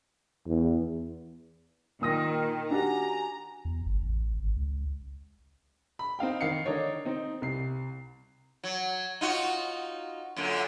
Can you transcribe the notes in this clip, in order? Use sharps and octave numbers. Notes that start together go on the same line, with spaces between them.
E2
A#2 D#3 A#4 G5 D#6 A#6
D4 F#4 G4 G#5 A#5
E2
G1
A1
G#1
C#2
B5
C4 D#4 F5 G5
D#3 F5 C7 C#7
D3 D#3 D4 D#4 C#5
C4 D#4
C2 C7
F#3
D#4 F4 F#4
F#2 A#2 D3